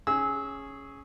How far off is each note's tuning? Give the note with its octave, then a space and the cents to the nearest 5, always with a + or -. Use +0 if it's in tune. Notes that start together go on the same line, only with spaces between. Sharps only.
C#4 +0 G#4 +0 E6 -25